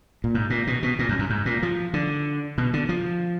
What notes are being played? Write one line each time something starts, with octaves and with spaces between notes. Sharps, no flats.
A#2
G#2
A#2
B2
B2
A#2
F#2
F#2
G#2
A#2
F3
D3
B2
D3
F3